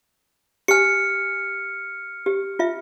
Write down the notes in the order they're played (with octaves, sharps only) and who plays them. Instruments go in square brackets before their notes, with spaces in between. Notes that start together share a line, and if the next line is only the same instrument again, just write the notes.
[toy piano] G4 G#5 [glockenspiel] F6 C#7
[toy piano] G4
F4 E5